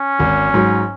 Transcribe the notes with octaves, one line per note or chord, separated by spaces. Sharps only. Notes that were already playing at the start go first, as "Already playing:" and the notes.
Already playing: C#4
G#1
G#2 F#3